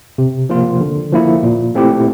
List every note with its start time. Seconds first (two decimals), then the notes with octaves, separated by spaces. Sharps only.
0.18 C3
0.49 F3 A#3 F4
0.81 D3
1.12 F3 A#3 E4
1.43 A#2
1.75 A3 C4 E4 G4